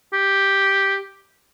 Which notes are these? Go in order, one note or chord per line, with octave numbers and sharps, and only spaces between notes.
G4